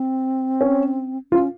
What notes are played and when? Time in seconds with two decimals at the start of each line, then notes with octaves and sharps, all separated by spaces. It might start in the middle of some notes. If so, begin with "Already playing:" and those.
Already playing: C4
0.61 C#4
1.32 C#4 F4